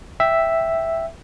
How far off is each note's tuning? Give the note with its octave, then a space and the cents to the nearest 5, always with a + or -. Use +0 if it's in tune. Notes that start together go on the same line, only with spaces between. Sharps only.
E5 +0 G5 +0